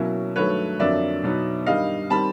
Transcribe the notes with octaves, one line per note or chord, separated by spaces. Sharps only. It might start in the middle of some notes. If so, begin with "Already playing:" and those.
Already playing: B2 F#3 A#3 C#4 E4
G2 D#3 F#3 A3 B4 C#5
F2 D3 F#3 A#3 D5 E5
B2 F#3 B3 D#4
G2 D#3 G3 D#5 F5
D#3 G3 C4 A5 B5